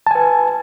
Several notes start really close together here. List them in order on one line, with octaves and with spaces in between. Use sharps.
A5 G#5 B4